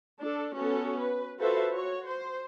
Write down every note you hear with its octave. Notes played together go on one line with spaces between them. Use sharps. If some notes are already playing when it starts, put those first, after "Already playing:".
D4 A4
B3 C#4 F#4 A4
B4
F4 F#4 A4 B4 C5 E5
F#4 C#5
C5